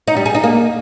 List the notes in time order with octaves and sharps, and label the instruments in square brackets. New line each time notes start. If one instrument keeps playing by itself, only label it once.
[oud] D#4
G3
G#4
D#4
A#3